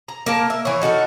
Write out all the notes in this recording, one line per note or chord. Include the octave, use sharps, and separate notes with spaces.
A#5
A#3 A#4 A5
E5
E3 C#5
D#4 F#4 A4 A#4